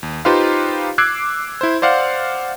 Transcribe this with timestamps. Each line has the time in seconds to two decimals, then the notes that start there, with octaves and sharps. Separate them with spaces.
0.03 D#2
0.25 D#4 F4 G4 B4 C5 F5
0.98 D6 E6 F#6 G#6 C7 D7
1.61 E4 C5
1.82 C5 D5 F5 F#5